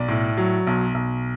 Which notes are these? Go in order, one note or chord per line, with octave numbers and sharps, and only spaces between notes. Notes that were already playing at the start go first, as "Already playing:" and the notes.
Already playing: B1 D5
A2
F#3
B1
B1